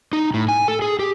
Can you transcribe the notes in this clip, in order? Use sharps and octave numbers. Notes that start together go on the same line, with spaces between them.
D#4
A2
G#5
A4
G#4
G4